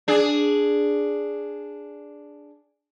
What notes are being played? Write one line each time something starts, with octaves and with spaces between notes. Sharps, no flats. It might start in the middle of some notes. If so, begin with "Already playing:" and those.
D4 G#4